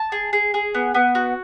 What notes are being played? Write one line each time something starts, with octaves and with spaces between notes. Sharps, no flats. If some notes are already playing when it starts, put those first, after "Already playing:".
Already playing: A5
G#4
G#4
G#4
B3
B3
F#4